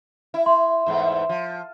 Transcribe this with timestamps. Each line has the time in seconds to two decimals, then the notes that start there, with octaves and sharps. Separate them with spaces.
0.34 E4
0.46 C6
0.86 E2 G#2 A3
1.29 F3